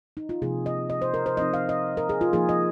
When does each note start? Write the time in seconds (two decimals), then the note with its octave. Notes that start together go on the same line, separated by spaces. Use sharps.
0.17 D#4
0.29 F4
0.42 C3 F3 A#3 D#4 G#4
0.66 D#5
0.90 D#5
1.02 C5
1.14 A#4
1.26 C5
1.37 F3 C4 D#4 D#5
1.54 F5
1.69 D#5
1.97 A#4
2.09 G#4
2.21 F4
2.33 F3 A#3 D#4 G#4
2.49 D#5